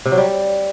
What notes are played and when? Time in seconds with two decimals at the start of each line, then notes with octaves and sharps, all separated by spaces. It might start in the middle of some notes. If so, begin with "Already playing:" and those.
0.06 C3
0.12 F#3
0.18 G3